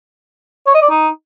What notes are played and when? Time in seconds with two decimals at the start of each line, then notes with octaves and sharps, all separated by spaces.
0.67 C#5
0.74 D#5
0.82 D5
0.89 D#4